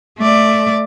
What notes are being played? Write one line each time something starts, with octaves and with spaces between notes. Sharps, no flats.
A3 D5